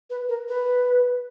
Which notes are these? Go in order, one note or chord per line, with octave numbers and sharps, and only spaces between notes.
B4
A#4
B4